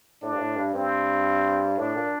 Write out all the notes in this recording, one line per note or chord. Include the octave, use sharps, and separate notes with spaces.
A2 D4
G2
A2
G2
G2 C4
A2 D4
A#2